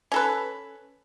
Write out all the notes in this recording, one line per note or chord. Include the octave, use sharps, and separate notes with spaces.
C#4 A4 B4